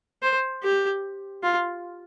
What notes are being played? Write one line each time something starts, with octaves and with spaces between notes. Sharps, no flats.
C5
G4
F4